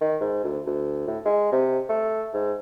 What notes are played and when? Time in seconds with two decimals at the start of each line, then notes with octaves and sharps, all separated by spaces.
0.01 D#3
0.21 G#2
0.44 D2
0.66 D2
1.08 A2
1.26 G#3
1.52 C3
1.89 A3
2.34 G#2